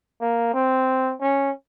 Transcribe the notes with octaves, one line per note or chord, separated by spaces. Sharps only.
A#3
C4
C#4